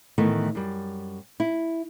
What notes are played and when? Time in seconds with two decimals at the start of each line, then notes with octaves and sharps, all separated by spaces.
0.18 A2 D#3 E3 A3 B3
0.55 F#2 G3
1.40 E4